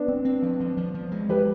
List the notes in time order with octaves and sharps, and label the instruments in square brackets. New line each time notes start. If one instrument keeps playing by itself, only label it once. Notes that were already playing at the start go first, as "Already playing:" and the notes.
Already playing: [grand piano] B3 D4
[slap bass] C4
C4
F3
F3
F3
F3
G#3
[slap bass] F3 [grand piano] G4 B4